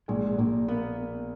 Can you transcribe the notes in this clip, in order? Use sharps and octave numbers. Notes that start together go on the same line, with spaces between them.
A#1 G#3
A#1 A#3
A#3 B3